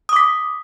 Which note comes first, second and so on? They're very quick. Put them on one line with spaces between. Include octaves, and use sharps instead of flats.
D#6 D6 B6